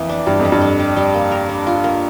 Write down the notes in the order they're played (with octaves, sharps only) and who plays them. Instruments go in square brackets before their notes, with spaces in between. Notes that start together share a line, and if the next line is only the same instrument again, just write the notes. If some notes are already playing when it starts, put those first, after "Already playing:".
Already playing: [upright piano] F2 [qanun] E3 A#3
[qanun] D4
[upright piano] G2 [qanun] G3
[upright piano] F2
[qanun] A4
[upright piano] G2
[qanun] D4
G3
G3
A#3
A#4
D4
F4
A#3